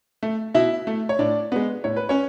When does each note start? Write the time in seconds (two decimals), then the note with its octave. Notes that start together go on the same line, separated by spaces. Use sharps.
0.23 A3
0.54 B2 E4 E5
0.87 A3
1.09 C#5
1.19 A2 D4 D5
1.52 G#3 B3
1.84 A2 C#5
1.96 B4
2.09 C#4 C#5